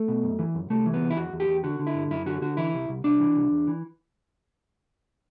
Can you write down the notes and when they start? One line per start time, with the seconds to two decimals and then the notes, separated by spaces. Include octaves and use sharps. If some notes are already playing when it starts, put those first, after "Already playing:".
Already playing: A3
0.08 B2
0.23 F#2
0.39 E3
0.55 F#2
0.70 C2 A3
0.86 E3
0.94 B3
1.01 C2
1.10 E4
1.17 E2 F#4
1.33 E2
1.40 G4
1.48 E2
1.63 D3 F#4
1.79 D3
1.87 E4
1.95 G2
2.11 F#2 E4
2.26 D3 F#4
2.41 D3 F#4
2.57 E3 E4
2.73 C2
2.89 C2
3.04 C2 D4
3.20 E3
3.36 C2
3.52 E2
3.67 E3